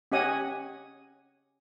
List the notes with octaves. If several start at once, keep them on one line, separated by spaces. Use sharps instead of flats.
C#4 G4 D#5 F#5 G#5 D#6